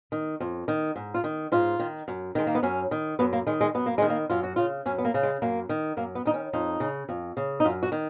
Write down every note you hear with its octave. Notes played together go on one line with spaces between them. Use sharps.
D#3
F2
D#3
G#2
F4
D#3
G#2 F4
D#3
F#2
D#3 G#3
A#3
B3
F#2 C#4
D#3
F#2 B3
A#3
D#3 G#3
G#3
F#2 B3
A#3
D#3 G#3
A#3
F#2 F4
F#4
C#3 F4
F#2 C#4
B3
A#3
C#3
G#3
F#2 A#3
D#3
F#2 A#3
B3
D#3 D#4
C#4
F2 D#4
C#3
F2
C#3
D#4
F#2 F4
F#4
D#3